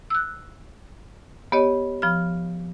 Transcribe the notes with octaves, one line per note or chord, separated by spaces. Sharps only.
E6 F#6
B3 G4 C#5 D#5
F3 B5 F6